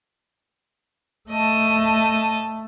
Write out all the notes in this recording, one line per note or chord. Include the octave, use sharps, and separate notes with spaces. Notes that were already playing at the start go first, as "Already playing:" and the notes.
A3 D#5 A5